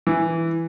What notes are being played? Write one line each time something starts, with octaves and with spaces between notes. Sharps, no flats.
E3